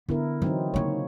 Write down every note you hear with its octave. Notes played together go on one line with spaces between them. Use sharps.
D3 B3 E4 A#4
E3 F#3 C4 D#4
C#3 A#3 D#4 C#5